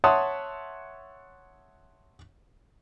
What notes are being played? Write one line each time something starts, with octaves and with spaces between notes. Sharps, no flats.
C#5 E5 F#5 A5 C6 D#6